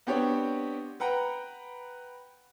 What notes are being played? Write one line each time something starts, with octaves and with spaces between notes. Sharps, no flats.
B3 C4 D4 G4 C#5
B4 F#5 G5 A#5